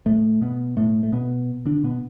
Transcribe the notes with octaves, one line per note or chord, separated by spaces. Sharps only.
A2 A3
B2 B3
A2 A3
A3
B2 B3
D3 D4
B2 B3